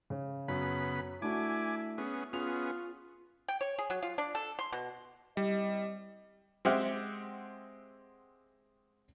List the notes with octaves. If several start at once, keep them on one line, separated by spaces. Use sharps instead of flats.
C#3
F#2 C#3 B3 B5
A3 D4 E4 F#4 G#5 D6
B3 C#4 G#4
B3 C#4 F4 G#4 F7
G5
C#5
G#4
F#3
F4
D4
A4
C6
B2
C3 G3 E4 D#5
G#3 C4 G4 E5 F#5 F6